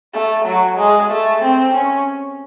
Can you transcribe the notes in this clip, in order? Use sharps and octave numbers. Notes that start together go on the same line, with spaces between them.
A3
F#3
G#3
A3
C4
C#4